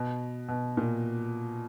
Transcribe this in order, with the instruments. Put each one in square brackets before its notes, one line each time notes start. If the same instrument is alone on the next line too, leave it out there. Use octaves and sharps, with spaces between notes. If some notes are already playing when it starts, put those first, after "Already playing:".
Already playing: [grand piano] B2
B2
A#2